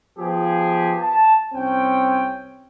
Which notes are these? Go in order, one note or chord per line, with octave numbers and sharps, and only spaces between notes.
F3 B3 G4 G#4
A5
C2 C4 C#4 G5